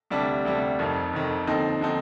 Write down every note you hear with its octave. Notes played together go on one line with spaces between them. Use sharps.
D2 C3 G3 D4
D2 C3 G3 D4
F1 F2 D#3
F1 F2 D#3
D#2 D3 F3 C4 D#4
D3 F3 C4 D#4